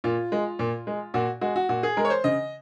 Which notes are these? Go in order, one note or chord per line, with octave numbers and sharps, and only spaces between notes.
A#2 F4
G#3
A#2
G#3
A#2 F#4
G#3 F#4
F#4
A#2 F#4
G#4
G#3 A#4
C#5
C5
C#3 D#5